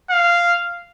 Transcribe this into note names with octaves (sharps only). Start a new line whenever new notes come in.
F5